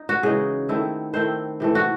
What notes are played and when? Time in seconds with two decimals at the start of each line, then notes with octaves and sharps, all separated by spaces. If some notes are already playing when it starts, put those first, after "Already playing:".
Already playing: D#4
0.09 F#4
0.23 C#3 E3 G#3 D#4 G#4
0.69 D#3 A3 C4 E4
1.14 D#3 A3 C4 E4 C5
1.60 C3 E3 A3
1.75 F#4